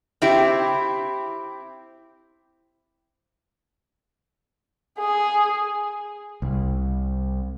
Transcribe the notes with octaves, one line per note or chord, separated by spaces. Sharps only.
C4 E4 G4
G#4
C2